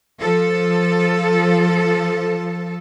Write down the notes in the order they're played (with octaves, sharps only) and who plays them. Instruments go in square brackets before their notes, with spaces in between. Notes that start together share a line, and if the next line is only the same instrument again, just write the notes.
[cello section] F3 A4